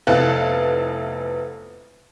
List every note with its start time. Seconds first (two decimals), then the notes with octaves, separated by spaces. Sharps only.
0.07 F1 B3 E4 A4 F5 F#6